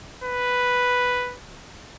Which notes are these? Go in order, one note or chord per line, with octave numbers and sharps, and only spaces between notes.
B4